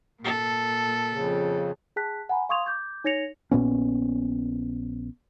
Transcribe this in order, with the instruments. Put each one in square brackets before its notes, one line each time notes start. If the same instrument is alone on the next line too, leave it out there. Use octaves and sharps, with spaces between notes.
[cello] A#2 A4
[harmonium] F2 C#3
[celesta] G#4 G5 A5 F#6 B6
F#5 G#5 A#5 B5
F5 C6 C#6 D#6 G#6 F7
D6 G6 G#6
D#4 C#5 G#6 A#6 C#7 F7
[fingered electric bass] A#1 A#2 B3 C#4